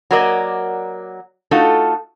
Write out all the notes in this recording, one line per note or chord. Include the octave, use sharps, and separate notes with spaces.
F#3 A#3 F#4 A#4 D5 D#5
A3 D#4 F4 F#4 A4